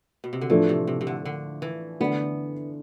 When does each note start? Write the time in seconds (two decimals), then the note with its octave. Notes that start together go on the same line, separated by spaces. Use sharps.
0.24 B2
0.33 C3
0.41 D3
0.50 A2 E3 F3 A3 D4
0.69 C3
0.87 C3
1.01 C3
1.07 D3
1.25 D3
1.62 E3
2.00 D3 A3 B3 D4